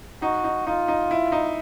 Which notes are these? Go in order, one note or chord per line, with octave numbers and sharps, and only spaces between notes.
D#4 F#4
D#4
D#4 F4
D#4
E4
D#4